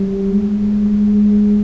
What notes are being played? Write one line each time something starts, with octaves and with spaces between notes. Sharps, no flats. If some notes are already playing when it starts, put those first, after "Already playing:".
Already playing: G3
G#3